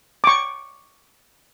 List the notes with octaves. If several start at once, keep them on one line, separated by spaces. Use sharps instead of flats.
C#6 D6